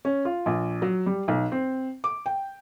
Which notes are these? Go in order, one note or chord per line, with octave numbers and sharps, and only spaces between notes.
C#4
F4
A#1
F#3
G3
B1
C4
D6
G5